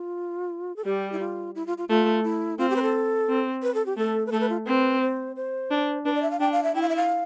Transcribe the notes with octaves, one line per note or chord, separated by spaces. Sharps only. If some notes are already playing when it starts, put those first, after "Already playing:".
Already playing: F4
A4
G3 G4
E4
F4
E4
F4
F4
A3 F4
E4
C4 F4
G4
B4
A4
C4
B4
A4
G4
A3 A4
B4
A3 A4
B4
F4
C4 B4
C5
C5
D4
D4 B4
D5
E5
F5
D4 G5
F5
E5
E4 G5
F5
E5
F5